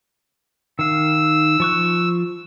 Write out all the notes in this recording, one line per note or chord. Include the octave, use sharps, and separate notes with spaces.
D#3 F5 E6
F3 C#6 F#6